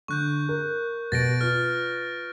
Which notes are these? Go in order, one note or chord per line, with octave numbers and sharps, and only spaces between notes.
D3 C#6 F#6 G6
A#4
B2 A6 A#6 D7
F4 B4 F6